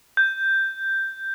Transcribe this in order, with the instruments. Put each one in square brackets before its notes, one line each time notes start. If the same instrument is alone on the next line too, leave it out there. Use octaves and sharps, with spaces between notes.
[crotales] G6